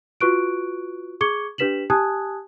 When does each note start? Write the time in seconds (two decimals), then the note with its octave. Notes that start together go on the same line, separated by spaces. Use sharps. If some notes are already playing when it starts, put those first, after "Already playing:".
0.21 F4 F#4 B4 C#6 F#6 D7
1.21 G#4 C#6 D6 G#6 C#7 G7
1.58 D4 G4 B4 B6 E7 F#7
1.90 G4 G#5 A5 D#6 F#6 G#6